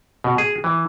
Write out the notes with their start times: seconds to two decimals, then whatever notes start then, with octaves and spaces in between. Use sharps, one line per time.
0.24 B2
0.38 G#4
0.64 E3